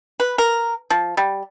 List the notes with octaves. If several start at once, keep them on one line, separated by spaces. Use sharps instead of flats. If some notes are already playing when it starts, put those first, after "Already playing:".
B4
A#4
F3
G3